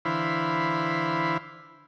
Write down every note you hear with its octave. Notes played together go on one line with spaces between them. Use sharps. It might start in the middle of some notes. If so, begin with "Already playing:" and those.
D3 E3 E4 C5 F5 B5